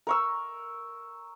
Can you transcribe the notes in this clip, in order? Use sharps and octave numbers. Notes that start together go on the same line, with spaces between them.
A#4 C#6 E6